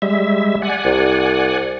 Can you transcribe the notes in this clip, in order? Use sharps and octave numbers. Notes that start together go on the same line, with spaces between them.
G3 G#3 E5
D5 F#5 G#5
C2